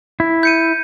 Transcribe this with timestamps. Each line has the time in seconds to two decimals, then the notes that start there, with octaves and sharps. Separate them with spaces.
0.20 E4
0.43 G6 C#7 D#7